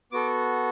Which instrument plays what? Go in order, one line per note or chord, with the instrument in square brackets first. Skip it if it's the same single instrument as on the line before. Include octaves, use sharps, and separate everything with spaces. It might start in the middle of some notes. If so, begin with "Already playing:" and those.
[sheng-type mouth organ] B3 F#4 A4 D6